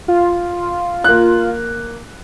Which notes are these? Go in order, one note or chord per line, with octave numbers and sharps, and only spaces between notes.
F4
A#3 F#6